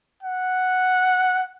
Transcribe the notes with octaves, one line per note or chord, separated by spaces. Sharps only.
F#5